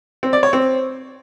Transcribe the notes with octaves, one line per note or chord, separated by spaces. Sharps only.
C4
D5
C#5
C4